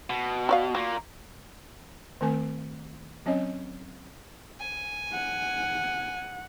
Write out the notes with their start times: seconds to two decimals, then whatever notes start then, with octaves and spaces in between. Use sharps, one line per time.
0.10 B2
0.49 F#4 D5 F5
0.75 A#2 A#3 F#4
2.21 D#3 A3 C4 A#4 G#5
3.26 F#3 C4 C#4 C#5 D#5
4.59 G#5
5.13 F#5